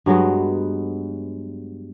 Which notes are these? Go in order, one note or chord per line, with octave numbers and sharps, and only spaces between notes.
G2 F#3 G#3 B3